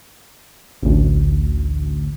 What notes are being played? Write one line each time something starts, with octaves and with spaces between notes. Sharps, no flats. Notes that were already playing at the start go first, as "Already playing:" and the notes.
A1 D2